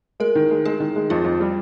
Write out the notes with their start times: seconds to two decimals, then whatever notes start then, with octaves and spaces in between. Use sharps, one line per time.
0.20 G#3 A#4
0.35 D#3
0.51 G#3
0.66 G#3 G#4
0.80 D#3
0.96 G#3
1.10 F2 F4
1.25 F2
1.40 G3